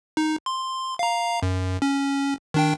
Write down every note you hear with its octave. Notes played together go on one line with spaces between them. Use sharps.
D#4
C6
F5 A#5
F#2
C#4
D#3 D4 G5